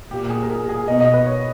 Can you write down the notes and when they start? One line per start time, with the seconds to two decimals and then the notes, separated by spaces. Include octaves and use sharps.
0.11 A#2 G4
0.30 G#4
0.43 A#4
0.50 G#4
0.69 G#4
0.87 B2 D#5
1.00 D#5
1.14 B4
1.26 C#5